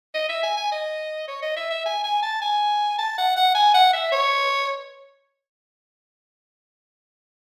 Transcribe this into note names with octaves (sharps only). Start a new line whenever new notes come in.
D#5
E5
G#5
G#5
D#5
C#5
D#5
E5
E5
G#5
G#5
A5
G#5
A5
F#5
F#5
G#5
F#5
E5
C#5